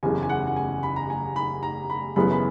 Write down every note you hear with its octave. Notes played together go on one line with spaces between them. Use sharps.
F#1 E2 C#3 G#5
G#5
F#5
F#5
G#5
B5
A#5
G#5
B5
A#5
B5
F#1 F#2 C#3 E3 B3 B5
B5